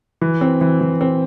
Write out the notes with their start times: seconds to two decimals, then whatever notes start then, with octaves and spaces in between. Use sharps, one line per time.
0.21 E3
0.41 C4
0.61 E3
0.81 E3
1.01 C4